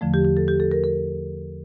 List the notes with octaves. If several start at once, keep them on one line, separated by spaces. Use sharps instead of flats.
E2 D3 F3 A3
G4
G4
A4
G4
A4
A#4
A#4